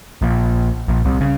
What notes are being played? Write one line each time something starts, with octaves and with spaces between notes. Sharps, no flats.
A#1 A#2
A#1 A#2
C2 C3
C#3